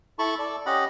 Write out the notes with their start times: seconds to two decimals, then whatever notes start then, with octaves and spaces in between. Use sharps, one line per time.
0.19 E4 A4 A5 B5 C#6
0.39 A4 D5
0.66 C#4 G4 D#5 F#5 B5